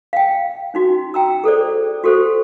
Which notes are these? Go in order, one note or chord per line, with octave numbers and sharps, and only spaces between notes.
F5 G5
C#4 D#4 F#4
G5 A#5 E6
G#4 A4 C5 D5
F#4 G4 A4 C5